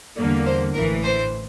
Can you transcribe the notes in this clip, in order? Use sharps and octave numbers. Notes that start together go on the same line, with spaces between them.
E2 D3 G3 A#3 D5
C5
A1 A2 E3 A#4
C5